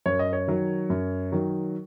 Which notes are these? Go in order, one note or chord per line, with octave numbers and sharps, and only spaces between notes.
F#2 C#5
D#5
C#5
D#3 F#3
F#2
D#3 F#3